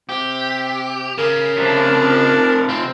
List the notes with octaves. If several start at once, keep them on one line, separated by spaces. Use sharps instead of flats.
C3 G4
C#3 A#4
C3 F3 D4
C4 F4